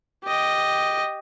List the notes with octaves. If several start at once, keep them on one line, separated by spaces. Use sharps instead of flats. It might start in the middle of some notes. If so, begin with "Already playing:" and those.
G4 D#5